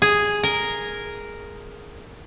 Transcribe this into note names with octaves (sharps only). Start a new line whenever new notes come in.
G#4
A#4